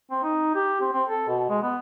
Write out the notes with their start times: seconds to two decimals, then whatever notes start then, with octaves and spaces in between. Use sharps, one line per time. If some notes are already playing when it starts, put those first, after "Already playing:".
0.11 C4
0.23 D#4
0.55 G4
0.81 C4
0.93 C4
1.08 A4
1.28 B2
1.49 G#3
1.62 B3